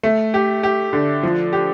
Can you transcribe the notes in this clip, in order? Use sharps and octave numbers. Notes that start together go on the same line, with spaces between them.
A3
G4
G4
D3
F3
G4